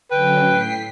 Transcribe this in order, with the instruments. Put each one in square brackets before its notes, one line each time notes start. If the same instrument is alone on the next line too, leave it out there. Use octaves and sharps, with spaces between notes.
[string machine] D3 F#3 C#4 [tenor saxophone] B4 [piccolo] G5
[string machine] A2 B6 C7